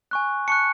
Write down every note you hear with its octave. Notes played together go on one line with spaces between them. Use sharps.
G#5 C#6 F#6
A5 C#6 F#6 C#7